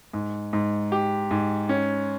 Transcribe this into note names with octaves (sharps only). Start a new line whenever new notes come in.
G#2
G#2
G4
G#2
C#4